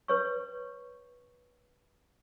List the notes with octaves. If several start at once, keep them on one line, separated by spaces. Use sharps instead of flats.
B4 C#5 C#6